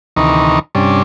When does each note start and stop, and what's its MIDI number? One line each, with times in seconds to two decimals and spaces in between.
0.16 0.59 38
0.16 0.59 48
0.16 0.59 51
0.16 0.59 52
0.16 0.59 63
0.16 0.59 85
0.75 1.02 43
0.75 1.02 48
0.75 1.02 55
0.75 1.02 61
0.75 1.02 62